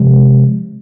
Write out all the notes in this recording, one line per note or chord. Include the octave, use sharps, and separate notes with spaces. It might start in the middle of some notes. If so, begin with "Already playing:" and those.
Already playing: C3 F3 G#3